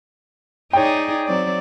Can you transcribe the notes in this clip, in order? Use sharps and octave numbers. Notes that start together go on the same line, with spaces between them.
D#4 G#4 C#5 D5 G5
F#3 C4 D5